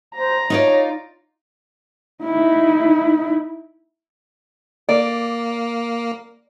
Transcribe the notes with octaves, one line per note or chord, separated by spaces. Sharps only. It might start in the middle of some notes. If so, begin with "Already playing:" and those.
C5 A#5
D#4 F4 C#5 D5
D#4 E4
A#3 D5